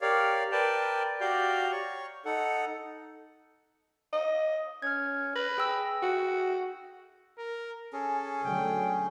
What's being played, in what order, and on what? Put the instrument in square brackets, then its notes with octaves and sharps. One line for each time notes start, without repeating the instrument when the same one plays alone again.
[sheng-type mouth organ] G4 A#4 C#5 D5 F5
A#4 B4 D5 G5 A5
F#4 G4 D5 F5 A#5 G6
C#5 C#6
D#4 A4 F#5
[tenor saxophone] D#5
[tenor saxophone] C#4 [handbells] F6 G#6
[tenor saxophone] B4 [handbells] A#6
[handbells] G#4 G5 E6
[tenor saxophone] F#4
[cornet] A#4
[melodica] C#4 G#4 [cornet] A4
[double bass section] D3 F#3 A3 [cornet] G5